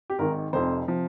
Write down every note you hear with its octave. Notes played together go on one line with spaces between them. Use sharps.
G4
G#1 G#2 D#3 A#4
F1 F2 C3 F3 C5
C3 F3